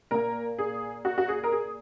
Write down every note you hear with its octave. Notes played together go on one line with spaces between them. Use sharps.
A#2 A#3 A#4
G#4
F#4
F#4
G#4
A#4
G#4